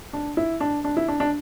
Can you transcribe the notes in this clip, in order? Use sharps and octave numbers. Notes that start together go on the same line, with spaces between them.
D4
E4
D4
D4
E4
D4
D4